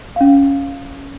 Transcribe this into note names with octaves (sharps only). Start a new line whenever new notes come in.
C#4 F5